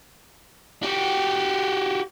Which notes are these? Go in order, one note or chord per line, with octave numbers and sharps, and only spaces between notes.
F#4 G4